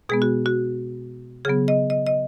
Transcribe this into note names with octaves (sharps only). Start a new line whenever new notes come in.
B2 G#3 B3 G#4
F#4
F#4
C#3 F#3 B3 G#4
D#5
D#5
D#5